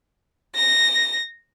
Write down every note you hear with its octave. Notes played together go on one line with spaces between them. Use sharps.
A#6